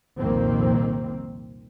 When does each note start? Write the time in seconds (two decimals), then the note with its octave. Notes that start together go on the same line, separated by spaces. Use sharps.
0.18 C2 F2 A#2 D#3 A#3 C4